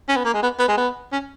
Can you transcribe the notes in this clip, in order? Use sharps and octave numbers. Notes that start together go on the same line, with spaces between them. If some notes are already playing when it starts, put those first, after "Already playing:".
C#4
B3
A#3
G#3
B3
B3
G#3
B3
C#4